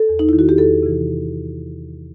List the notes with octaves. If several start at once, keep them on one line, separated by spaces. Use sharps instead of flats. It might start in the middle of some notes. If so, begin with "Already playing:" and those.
Already playing: A4
E2
D#4
D#3 E4
F#4
G4
E2 A4
C3 E3